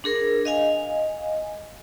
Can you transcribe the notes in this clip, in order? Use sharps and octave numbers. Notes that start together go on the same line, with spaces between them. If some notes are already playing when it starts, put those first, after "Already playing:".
D4 G#4 A#4
D#5 F5 G#5